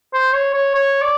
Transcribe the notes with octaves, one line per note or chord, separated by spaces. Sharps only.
C5
C#5
C#5
C#5
D5